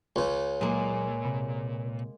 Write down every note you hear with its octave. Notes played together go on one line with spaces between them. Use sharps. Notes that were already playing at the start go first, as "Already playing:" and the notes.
C#2 C#3
A#2 F#3 G#3 A#3
C3 B5